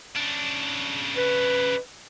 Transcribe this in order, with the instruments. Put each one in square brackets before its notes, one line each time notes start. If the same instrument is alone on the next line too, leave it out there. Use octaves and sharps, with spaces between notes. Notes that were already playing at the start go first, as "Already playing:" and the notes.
[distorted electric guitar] C#3 D4
[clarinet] B4